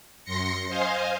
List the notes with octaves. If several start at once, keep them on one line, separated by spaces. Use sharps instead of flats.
F#2 C6 A#6 C#7
C5 D#5 F5 G#5